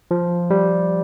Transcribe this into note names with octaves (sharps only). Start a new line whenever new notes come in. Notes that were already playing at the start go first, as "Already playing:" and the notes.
F3
G3